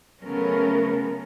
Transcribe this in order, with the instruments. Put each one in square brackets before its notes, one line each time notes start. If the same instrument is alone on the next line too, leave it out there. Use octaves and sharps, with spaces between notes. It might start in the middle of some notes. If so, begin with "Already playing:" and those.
[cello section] C#3 F#3 A3 B3 C#4 A#4